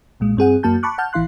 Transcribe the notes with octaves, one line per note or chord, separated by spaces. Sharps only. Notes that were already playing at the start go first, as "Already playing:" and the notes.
B1 A#2 G#3
G2 C4 G#4 F#5
F#2 A#3 F#4 A5 G6
A5 B5 C#6 D6 F#6
F#5 A5 F6 G6
A1 E3 E4 F5 C6 F#6